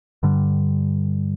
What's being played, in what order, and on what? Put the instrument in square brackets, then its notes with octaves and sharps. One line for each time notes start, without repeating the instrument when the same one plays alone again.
[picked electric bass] G2 D3 G3